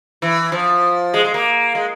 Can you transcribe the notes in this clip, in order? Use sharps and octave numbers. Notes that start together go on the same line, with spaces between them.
E3
F3
G#3
G#3
A#3
G#3